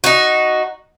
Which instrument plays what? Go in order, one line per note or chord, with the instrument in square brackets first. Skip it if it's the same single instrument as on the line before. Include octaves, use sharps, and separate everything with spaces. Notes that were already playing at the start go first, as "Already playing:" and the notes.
[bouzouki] D#4 F#4